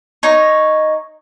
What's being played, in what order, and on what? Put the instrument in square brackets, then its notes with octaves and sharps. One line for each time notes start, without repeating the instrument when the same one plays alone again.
[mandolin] D#4 C#5